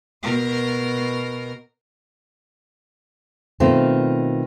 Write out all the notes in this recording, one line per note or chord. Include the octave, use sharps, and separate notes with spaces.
B2 A#4
B2 D#3 A3 C4 F4